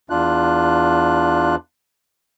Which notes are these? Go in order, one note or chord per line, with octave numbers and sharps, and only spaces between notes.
E2 D4 F4 F#6